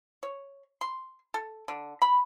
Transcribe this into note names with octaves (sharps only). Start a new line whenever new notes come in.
C#5
C6
A4
D3
B5